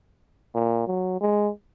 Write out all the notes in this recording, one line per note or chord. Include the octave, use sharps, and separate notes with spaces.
A#2
F#3
G#3